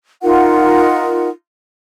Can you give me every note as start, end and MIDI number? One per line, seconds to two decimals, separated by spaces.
0.23 1.28 63
0.23 1.28 65
0.23 1.28 70
0.23 1.28 78